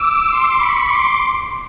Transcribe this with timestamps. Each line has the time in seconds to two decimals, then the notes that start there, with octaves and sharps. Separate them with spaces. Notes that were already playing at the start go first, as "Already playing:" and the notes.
Already playing: D6 E6
0.31 C6 D6
0.59 B5 C#6
0.88 C6 D6